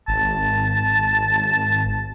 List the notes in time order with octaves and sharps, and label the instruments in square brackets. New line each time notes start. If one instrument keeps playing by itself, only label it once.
[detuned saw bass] G#1 [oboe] A5